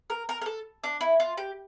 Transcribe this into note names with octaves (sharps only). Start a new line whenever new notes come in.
A#4
A#4
A#4
A4
D4
E4
F4
G4